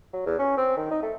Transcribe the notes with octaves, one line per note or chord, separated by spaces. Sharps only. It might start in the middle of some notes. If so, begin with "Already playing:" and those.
F#3
E2
C#4
C4
D#3
D#4
A3